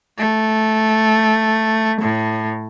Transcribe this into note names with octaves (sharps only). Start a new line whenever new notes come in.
A3
A2